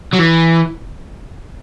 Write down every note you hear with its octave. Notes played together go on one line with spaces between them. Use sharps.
F#3
E3